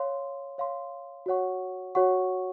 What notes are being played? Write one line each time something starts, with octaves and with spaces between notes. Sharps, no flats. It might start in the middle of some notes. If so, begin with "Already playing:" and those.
Already playing: C#5 F5 C6
C#5 F5 C6
F#4 C#5 F#5 C#6
F#4 C#5 F#5 C#6